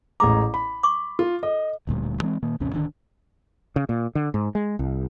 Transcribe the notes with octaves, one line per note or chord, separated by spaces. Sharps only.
A1 G#3 A#5 D6
B5
C#6 D6
F4
A4 D#5
D1 D2 A#2 G3
E3 G#3 C4
A#2 D#3 A#3
A1 D#2 C3 C#4
D1 D3 D#3 D4
C#3
A#2
D3
G#2
G#3
C2